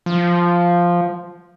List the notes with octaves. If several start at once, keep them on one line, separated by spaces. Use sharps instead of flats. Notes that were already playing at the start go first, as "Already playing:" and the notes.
F3